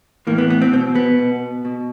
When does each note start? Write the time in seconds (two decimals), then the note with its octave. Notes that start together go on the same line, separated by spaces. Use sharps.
0.27 A2 E3 A#3
0.38 B3
0.50 B3
0.62 C4
0.72 B2 C4
0.95 B3
1.19 B2
1.65 B2